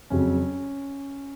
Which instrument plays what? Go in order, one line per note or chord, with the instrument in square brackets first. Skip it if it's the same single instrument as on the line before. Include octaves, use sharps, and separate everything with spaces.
[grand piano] F2 C#3 F#3 C#4